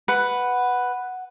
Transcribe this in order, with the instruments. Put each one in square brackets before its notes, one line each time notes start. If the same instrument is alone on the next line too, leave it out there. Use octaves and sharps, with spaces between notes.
[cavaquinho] B4 [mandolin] F#5